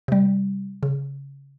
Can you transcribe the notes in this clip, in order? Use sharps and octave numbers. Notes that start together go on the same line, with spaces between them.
C3 G3
C#3